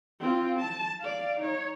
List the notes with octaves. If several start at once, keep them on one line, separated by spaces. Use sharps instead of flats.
C4 F4
A5
D5 F5
D#4 C#5